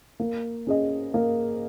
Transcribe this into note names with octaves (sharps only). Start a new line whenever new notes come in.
A#3
C#4 G#4 D#5
A#3